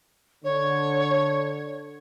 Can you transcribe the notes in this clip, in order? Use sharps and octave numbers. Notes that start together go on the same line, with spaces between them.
D3 C#5